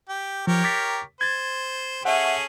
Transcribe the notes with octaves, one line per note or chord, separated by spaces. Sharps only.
G4
F3 G4 A#4 C#5
D6 A6 B6
C5 G#6 A6
C#4 G#4 A4 E5 F#5